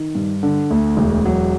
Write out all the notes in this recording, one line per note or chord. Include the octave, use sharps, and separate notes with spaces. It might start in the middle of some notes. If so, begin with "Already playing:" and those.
Already playing: D#3
G2
D3
D2
E1
F#3